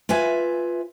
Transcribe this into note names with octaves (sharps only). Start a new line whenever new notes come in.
F4 B4 E5 G#5